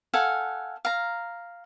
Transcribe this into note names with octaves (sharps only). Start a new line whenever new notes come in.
A4 F5 F#5 G#5
F5 A#5